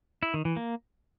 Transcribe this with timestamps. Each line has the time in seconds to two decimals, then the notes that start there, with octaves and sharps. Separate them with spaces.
0.23 E4
0.34 D#3
0.45 E3
0.56 A#3